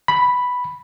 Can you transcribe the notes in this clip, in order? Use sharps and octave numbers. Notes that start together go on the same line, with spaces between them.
B5